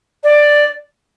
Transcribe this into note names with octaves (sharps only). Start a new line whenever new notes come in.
D5